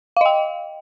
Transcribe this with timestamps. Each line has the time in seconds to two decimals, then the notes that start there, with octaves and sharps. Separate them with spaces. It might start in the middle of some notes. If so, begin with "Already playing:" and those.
0.17 F5
0.21 D#5
0.25 G5